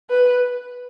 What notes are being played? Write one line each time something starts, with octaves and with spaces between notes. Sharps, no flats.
B4